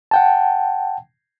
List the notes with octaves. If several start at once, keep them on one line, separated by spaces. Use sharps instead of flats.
F#5 G5 A5